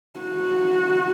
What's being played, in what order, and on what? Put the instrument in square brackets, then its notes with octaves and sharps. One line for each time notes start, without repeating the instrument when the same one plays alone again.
[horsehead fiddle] F#4